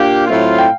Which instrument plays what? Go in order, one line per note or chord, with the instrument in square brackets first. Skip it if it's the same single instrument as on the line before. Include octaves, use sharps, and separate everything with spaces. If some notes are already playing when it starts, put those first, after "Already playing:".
Already playing: [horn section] A#2 D4 G4 [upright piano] F5
[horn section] A2 F#3 A3 C4 F4
[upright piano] G5